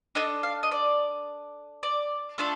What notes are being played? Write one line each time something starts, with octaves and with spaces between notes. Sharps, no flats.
D4 A4 D#5
F5
D#5
D5
D5
A3 D4 F4 A4